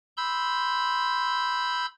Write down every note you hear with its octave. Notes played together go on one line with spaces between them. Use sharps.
B5 C6 E6 G6